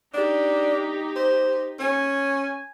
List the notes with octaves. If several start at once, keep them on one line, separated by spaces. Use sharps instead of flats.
D4 D#4 G4
C5
C#4 G#5